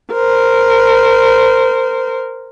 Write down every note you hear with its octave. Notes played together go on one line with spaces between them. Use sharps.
A#4 C5